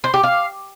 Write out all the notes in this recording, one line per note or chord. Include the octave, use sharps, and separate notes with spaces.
C5
G4
F5